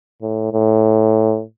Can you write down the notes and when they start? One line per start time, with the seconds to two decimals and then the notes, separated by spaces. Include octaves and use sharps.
0.22 A2
0.53 A2